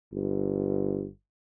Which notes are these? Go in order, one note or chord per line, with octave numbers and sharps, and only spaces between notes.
G1